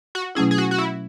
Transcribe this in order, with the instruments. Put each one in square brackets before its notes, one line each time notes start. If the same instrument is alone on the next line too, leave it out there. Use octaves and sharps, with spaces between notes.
[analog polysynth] F#4
[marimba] B2 F#3 A3 C#4 E4 [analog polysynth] G#4
[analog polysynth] G#4
F#4
F#4
E4